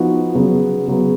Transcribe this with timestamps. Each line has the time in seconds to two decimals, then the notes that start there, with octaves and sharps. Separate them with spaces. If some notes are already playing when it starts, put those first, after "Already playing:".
Already playing: F3 B3 D#4 F#4
0.34 C#3 F#3 B3
0.87 C#3 F#3 B3